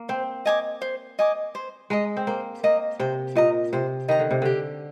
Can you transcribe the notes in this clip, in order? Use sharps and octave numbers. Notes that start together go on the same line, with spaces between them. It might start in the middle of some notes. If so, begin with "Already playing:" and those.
Already playing: A#3
C4 C5
D#5 G#5 D6
C5
D#5 G#5 D6
C5
G#3 D#5 A#5
C4
A#3 C5
A#3 D#5 A#5
C3 C5
A#2 D#5 A#5
C3 C5
D#3 D#5 A#5
D3
C3
D3 G4